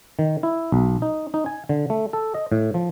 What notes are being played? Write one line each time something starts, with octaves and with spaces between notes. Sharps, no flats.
D#3
E4
B1
D#4
D#4
G#5
D3
A3
A4
D#5
A2
F3